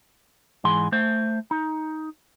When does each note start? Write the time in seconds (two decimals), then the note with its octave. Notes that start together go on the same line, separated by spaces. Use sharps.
0.64 G#2 E3 G#4 C6
0.92 A3 C5
1.51 D#4